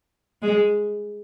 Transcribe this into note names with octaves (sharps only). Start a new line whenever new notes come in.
G#3